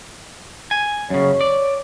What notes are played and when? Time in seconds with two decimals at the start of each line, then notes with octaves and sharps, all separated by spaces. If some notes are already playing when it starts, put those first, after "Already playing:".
0.71 G#5
1.10 F#2 C#3 C#5
1.41 D5